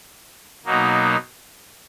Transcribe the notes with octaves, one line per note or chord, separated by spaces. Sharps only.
B2 F#3 A#3 D#4